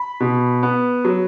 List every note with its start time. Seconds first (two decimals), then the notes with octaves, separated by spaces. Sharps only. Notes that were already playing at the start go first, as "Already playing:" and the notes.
Already playing: B5
0.20 B2
0.63 B3
1.05 F#3